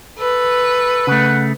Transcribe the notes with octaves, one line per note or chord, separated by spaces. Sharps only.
A4 B4
C#3 A3 F#5